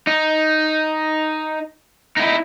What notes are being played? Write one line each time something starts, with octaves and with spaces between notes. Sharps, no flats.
D#4
D#4 E4